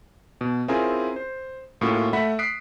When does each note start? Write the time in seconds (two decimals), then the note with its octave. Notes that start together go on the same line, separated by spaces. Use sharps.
0.41 B2
0.68 C4 C#4 E4 F4 G#4 A#4
1.16 C5
1.81 A2 A#3 C#4 F4 F#4
2.13 A3 E5 F#5 B5 B6
2.39 D#6 F#6 B6 C7 D7